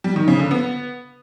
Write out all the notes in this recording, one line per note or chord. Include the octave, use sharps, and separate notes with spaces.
G3
D#3
C#3
D3
B3